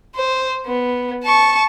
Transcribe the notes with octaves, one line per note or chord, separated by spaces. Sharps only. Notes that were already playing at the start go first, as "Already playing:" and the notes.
C5
B3
A5 C#6